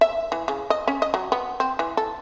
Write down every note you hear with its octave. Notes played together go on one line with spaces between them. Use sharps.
E5
E3
C#3
D#5
C#4
D#5
F#3
B3
C4
E3
A4